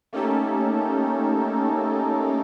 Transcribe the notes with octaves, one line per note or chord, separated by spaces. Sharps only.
A3 A#3 C#4 D#4 G4 A4